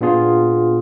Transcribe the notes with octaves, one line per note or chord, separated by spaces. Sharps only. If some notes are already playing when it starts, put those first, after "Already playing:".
A#2 B3 D4 F4 G#4